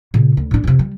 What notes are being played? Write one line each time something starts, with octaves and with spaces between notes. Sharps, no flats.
A#2 C#3
D2
A2 D4
F2 C3
G3